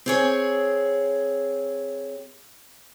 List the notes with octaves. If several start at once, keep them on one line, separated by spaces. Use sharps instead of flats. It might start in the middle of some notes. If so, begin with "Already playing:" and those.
C4 G#4 C#5